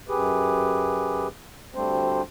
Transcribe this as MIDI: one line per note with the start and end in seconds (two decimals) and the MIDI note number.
0.08 1.27 42
0.08 1.27 67
0.08 1.27 68
0.08 1.27 71
1.75 2.22 38
1.75 2.22 55
1.75 2.22 57
1.75 2.22 60
1.75 2.22 62
1.75 2.22 72